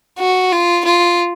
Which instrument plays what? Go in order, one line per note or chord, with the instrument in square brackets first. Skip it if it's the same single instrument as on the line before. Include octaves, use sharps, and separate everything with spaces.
[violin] F#4
F4
F4